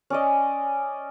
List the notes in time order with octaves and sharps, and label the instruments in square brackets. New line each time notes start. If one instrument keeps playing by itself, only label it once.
[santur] C#4 D5 D#5